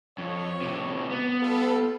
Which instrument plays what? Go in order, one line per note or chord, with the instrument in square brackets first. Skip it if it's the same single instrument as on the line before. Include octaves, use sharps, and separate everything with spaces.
[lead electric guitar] F2 [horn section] C#5
[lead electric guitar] A2 C3
B3
[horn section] G3 F4 A4